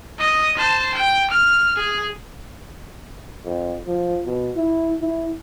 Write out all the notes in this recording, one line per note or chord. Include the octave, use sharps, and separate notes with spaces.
D#5 D#6
C5 A5
G5
F6
G#4
F2
F3
B2
E4
E4